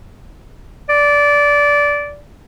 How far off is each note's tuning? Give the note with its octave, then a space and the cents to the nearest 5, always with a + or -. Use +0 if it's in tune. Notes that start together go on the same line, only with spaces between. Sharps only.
D5 -15